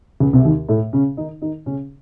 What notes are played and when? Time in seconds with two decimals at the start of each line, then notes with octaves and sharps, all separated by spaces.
0.20 C#2 C#3
0.33 C2 C3
0.45 D#2 D#3
0.69 A2 A3
0.93 C#3 C#4
1.17 D#3 D#4
1.42 D#3 D#4
1.66 C#3 C#4